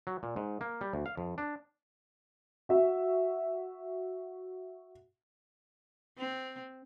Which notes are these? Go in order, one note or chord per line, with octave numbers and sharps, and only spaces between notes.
F#3
A#2
G#2
A#3
G3
D2
F5
F2
D4
F#4 E5
C4